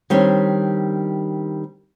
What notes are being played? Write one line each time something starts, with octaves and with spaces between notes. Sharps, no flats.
D#3 G3 C4 D4 C#5